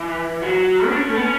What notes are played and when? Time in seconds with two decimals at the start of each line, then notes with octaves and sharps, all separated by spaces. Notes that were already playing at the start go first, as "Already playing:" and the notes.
Already playing: E3
0.42 F#3
0.88 D4
0.96 C#4
1.09 A3
1.15 B3
1.23 C#4